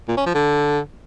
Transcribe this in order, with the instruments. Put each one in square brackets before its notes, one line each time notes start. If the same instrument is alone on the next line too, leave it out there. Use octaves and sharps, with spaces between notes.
[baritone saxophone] A#2
C#4
F3
D3